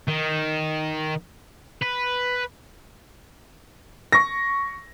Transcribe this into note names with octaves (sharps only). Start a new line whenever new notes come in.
D#3
B4
C#6 A#6